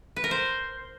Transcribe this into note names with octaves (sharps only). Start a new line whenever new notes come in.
B4
A#4
C5